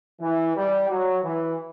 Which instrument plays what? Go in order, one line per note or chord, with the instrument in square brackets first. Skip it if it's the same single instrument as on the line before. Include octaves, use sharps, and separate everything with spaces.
[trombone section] E3
G3
F#3
E3